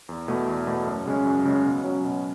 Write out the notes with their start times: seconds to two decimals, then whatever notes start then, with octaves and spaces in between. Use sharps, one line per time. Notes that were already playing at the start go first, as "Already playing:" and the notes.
0.09 E2
0.28 B2 A3
0.48 E2
0.67 B2 A3
0.87 F#2
1.06 C#3 G#3 C#4
1.26 F#2
1.45 C#3 G#3 C#4
1.65 B2
1.84 F#3 C#4
2.04 B2